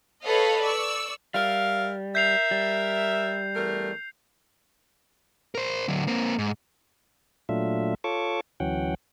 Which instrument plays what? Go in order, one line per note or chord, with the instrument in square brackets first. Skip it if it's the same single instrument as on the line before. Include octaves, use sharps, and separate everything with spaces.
[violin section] A4 B4 C#5 D#5 F5
D5 C#6 E6
[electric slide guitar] G3 [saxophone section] A#4 E5 F5
[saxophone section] A#4 E5 [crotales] G6 C7 F7
[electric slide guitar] G3
[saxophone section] E2 A3 A#4
[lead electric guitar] A#4 C5
D3 F#3
A#3 C4
G#2
[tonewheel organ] A#2 F#3 A3 D4 F4 E5
F4 A4 C#5 A5 C#6 D6
D2 E3 F#3 C#4 F#5 G5